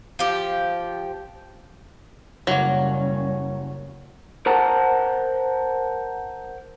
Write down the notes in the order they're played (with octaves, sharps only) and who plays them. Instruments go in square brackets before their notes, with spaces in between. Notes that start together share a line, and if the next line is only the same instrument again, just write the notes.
[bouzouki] F3 G4
[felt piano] F#1 G#6 [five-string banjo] F#3 A#3 [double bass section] G3 C#4
[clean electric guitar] A#4 C5 F#5 A5 A#5